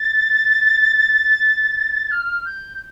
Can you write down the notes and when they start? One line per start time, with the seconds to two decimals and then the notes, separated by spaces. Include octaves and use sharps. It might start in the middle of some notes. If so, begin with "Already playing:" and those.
Already playing: A6
2.11 F6
2.45 G6